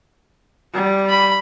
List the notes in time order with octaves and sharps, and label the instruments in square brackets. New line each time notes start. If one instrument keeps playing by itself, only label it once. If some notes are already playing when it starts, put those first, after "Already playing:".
[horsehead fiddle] G3
[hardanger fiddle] B5